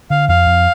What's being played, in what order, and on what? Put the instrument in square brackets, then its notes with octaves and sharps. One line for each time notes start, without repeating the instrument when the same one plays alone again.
[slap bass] D3 [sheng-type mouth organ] F5
[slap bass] F2 [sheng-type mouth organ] F5
[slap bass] F2